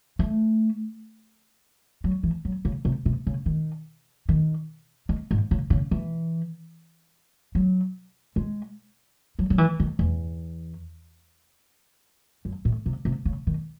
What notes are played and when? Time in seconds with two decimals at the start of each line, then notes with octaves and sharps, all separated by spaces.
0.19 A3
2.04 F#3
2.23 E3
2.45 F#3
2.65 C#3
2.85 C3
3.06 C3
3.27 C#3
3.46 D#3
4.29 D#3
5.09 D#3
5.31 G#2
5.51 C#3
5.70 C#3
5.91 E3
7.55 F#3
8.36 G#3
9.39 F#3
9.50 F#3
9.58 E3
9.80 D#3
9.99 E2
12.45 F#2
12.65 A2
12.86 C3
13.05 C3
13.25 C#3
13.47 D#3